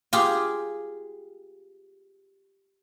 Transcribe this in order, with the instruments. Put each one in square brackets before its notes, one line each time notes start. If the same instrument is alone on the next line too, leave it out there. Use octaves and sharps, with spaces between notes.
[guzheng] F4 G4 G#4